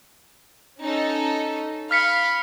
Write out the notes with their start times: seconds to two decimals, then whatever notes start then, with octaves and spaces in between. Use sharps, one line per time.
0.81 C#4 D#4 A4
1.91 F5 B5 F6 B6 C#7